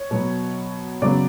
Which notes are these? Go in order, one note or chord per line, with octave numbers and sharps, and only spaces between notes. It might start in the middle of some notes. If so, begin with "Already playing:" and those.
Already playing: C#5
B2 F#3 B3
C#3 F#3 B3 D5